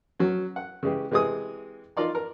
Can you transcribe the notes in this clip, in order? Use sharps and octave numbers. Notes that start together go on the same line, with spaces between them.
F#3 C#4
F#5
C#3 E3 G#3 G4
C3 E3 G#3 G#5 D#6
D#4 F4 A#4 D5 C6
A#4